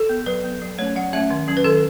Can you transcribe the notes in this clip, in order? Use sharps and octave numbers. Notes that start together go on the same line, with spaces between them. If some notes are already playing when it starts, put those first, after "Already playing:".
Already playing: A4
B3
F#3 B4
B3
F#3
A3 C#4 C#5
F#3 F#5
A3 C#4 E5
D#3
F#3 C#4
B4
D#3 A4